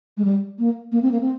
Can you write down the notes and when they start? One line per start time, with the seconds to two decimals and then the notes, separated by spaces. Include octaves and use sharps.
0.17 G#3
0.25 G3
0.59 A#3
0.92 A#3
1.02 C4
1.12 A#3
1.21 C4